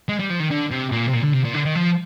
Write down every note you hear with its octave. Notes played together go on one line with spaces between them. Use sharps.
G#3
G3
F3
D#3
D3
C3
A#2
C3
A#2
D3
C3
A#2
D3
D#3
F3